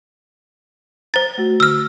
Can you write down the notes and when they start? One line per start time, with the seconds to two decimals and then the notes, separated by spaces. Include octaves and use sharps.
1.14 C5 A#5 A6
1.38 A3 F#4
1.60 D3 E6 F6